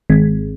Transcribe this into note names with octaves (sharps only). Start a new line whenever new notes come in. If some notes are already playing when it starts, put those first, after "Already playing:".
G#1